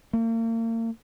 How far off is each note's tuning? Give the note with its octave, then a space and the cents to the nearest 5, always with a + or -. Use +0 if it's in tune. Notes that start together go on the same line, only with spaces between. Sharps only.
A#3 -40